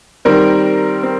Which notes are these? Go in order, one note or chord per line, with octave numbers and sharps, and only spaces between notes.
D#3 G3 C4 A#4
C4